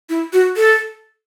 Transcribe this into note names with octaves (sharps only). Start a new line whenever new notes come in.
E4
F#4
A4